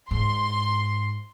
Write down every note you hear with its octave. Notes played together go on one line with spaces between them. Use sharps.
G#2 C6